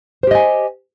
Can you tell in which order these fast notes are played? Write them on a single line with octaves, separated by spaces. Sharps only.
C5 G4 D#5 G#5